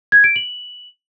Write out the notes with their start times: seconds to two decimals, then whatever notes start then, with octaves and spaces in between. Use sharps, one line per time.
0.12 G#6
0.24 D7
0.36 F#7